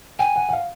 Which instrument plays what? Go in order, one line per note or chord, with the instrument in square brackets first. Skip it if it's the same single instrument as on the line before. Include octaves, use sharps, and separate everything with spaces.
[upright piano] G5 [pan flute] G#5
[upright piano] F#5
F#5
F5